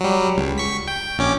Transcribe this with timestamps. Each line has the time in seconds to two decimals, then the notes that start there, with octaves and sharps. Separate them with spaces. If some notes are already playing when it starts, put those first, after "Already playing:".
0.01 F#3 G3
0.37 C#2
0.58 C#6 B6
0.87 G5
1.18 A#1 C#4 D6